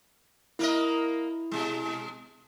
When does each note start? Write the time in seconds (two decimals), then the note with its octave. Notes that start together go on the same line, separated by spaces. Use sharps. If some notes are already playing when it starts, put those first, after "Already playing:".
0.59 A#3 E4 A#4 D#5
1.52 B2 G#3